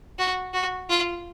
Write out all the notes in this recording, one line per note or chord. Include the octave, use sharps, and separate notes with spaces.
F#4
F#4
F4